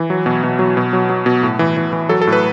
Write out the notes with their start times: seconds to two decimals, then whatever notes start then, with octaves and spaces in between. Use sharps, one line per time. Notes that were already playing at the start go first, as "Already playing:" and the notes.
Already playing: E3
0.10 F#3
0.26 B2
0.44 B2
0.59 F#3
0.77 B2
0.93 F#3
1.09 F#3
1.26 B2
1.43 A2
1.59 E3
1.77 E3
1.93 E3
2.09 F#3 A4
2.21 A4
2.27 A2
2.32 B4